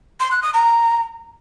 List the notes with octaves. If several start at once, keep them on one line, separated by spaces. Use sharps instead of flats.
C6
F#6
D#6
A#5